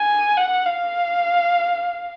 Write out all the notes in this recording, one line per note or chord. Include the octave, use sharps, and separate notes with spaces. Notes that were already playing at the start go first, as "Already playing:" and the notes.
Already playing: G#5
F#5
F5